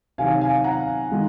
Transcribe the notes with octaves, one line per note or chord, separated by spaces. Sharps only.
C3 D#3 F#3 F5 G#5
F5 G#5
F#5 A#5
D#3 G#3